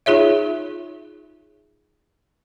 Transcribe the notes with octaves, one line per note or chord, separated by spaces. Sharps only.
D#4 F4 G#4 C#5 E5